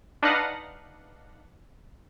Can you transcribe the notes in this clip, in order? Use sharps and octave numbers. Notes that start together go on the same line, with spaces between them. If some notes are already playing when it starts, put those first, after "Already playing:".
D4 D#4 B4 D#5 F5 F#5